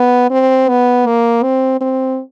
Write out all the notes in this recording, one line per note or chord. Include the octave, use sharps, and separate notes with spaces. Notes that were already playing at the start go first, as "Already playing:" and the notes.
Already playing: B3
C4
B3
A#3
C4
C4